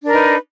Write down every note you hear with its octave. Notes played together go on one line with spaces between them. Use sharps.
D4 D#4 A#4 B4